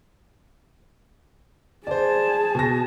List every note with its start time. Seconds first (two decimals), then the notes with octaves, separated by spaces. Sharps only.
1.87 G#4 C5 D5 A5
2.55 B2 A#6